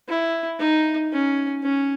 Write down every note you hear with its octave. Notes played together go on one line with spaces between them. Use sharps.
E4
D#4
C#4
C#4